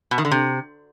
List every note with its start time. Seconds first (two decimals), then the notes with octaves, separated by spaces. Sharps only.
0.11 B2
0.18 D#3
0.25 D3
0.31 C3